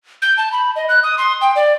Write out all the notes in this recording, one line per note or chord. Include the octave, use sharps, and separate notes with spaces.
G6
A5
B5
D#5
F#6
D#6
C6
G5
D5